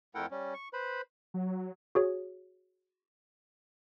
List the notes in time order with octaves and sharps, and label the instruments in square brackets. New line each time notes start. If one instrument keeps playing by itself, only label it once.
[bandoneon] F2 A3 E4 A#4 F#5 G5
G3 C#4
C#6
B4 C5 B5
[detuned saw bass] F#3
[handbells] F#4 G#4 C#5